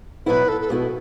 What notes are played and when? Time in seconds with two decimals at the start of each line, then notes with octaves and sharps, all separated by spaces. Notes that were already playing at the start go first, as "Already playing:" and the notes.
0.26 B2 F#3 B3 E4 B4
0.48 A4
0.61 A4
0.70 B2 B3 E4 F#4